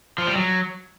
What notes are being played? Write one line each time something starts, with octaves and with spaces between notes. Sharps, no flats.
F3
G3
F#3